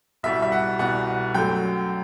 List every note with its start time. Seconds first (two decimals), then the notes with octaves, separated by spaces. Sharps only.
0.23 C2 B2 G3 E5
0.42 E5
0.52 F#5
0.79 C2 B2 G3 F#5
1.34 F#2 F#3 A3 G5